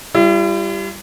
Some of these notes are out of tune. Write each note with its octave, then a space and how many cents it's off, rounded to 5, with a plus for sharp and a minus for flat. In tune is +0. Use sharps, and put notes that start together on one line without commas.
G3 +0 E4 +45